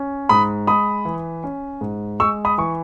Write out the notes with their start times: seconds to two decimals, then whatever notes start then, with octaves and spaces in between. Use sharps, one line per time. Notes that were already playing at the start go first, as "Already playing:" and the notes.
Already playing: C#4
0.29 G#2 B5 D#6
0.67 G#3 B5 D#6
1.05 E3
1.44 C#4
1.81 G#2
2.20 G#3 C#6 E6
2.45 B5 D#6
2.58 E3 C#6